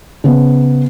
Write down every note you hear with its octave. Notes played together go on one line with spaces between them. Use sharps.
C#3 B3